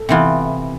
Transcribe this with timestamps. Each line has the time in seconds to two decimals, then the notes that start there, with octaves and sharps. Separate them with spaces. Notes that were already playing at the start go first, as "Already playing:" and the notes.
Already playing: A4
0.09 C3 E3 B3 F4